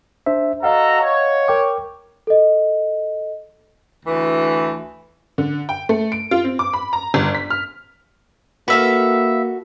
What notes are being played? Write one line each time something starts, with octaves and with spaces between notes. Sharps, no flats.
D4 C5 E5
F#4 A4 D#5 F5 F#5 A#5
C#5
A#4 G5 D6
A4 D#5
D2 E3
D3
G5
A3
D7
F4
C4
D6
B5
A#5
G1
B6
F6
A#3 F#4 A4 B4 E5 F5